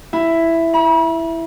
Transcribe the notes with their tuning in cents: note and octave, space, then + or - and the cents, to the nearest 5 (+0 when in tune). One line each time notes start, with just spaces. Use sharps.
E4 +5
B5 -40